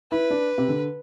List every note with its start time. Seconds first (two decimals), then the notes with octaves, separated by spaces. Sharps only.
0.11 E4 B4
0.30 D4
0.58 C3
0.68 D3